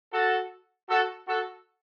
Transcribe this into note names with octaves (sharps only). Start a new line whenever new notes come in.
F#4 A4
F#4 A4
F#4 A4